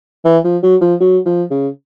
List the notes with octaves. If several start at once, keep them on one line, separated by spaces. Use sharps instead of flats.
E3
F3
F#3
F3
F#3
F3
C#3